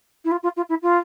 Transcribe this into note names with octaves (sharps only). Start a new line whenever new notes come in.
E4
F4
F4
F4
E4
F4